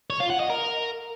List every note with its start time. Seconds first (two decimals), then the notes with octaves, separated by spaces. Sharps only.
0.10 C#5
0.20 F4
0.30 F#5
0.40 D#5
0.50 A#4